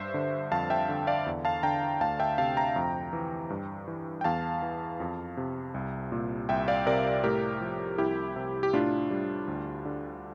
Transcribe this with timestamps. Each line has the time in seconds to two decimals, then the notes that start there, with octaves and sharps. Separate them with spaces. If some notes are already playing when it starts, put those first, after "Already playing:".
Already playing: G2 C5 E5
0.14 D3
0.52 F2 F5 A5
0.70 E5 G5
0.89 D3
1.07 D5 F5
1.26 E2
1.45 F5 A5
1.63 D3 G5 A#5
2.01 D2 F5 A5
2.20 E5 G5
2.38 C3 F5 A5
2.57 G5 A#5
2.76 F2
3.13 E3
3.50 G2
3.88 E3
4.21 G5
4.24 E2 F5 A5
4.62 E3
5.00 F2
5.37 C3
5.74 C2
6.12 A#2
6.49 C2 E5 G5
6.68 D5 F5
6.86 C3 A#4 D5
7.24 A2 G4 A#4
7.61 F3
7.98 C2 E4 G4
8.36 C3
8.63 G4
8.73 A2 D4 F4
9.11 G3
9.48 D2
9.85 D3